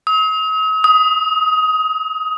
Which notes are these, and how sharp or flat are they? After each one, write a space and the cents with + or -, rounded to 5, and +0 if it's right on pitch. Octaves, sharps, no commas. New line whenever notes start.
D#6 +45
D#6 +20